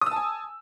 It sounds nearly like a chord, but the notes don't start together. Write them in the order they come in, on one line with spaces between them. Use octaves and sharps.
D#6 E6 A5 G#5